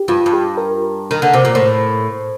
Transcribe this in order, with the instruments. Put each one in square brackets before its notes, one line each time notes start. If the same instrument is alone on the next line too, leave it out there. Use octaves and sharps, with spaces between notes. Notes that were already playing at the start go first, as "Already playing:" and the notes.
Already playing: [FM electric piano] G4
[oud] G2 [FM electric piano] F4
[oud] G2
[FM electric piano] G4
A#4
[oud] D#3
D3
C3
A#2
[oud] A2 [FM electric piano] C5